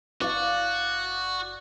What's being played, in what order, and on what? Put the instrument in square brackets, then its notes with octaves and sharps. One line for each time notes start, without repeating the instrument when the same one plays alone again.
[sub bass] F#1 [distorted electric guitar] F#4 [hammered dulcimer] D5 F5